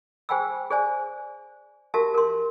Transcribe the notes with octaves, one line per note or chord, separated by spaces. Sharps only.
G#4 C5 G5 G#5 B5 E6
G#4 C5 D5 G#5
F#4 G4 A#4 E5 A5
A#4 C6